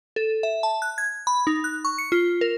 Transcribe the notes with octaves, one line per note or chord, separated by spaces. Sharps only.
A4
E5
A5
F#6
G#6
B5
D#4
F#6
C#6
C#7
F4
A#4